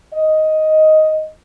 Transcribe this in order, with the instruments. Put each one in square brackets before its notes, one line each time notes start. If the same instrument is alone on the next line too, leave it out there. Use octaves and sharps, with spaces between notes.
[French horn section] D#5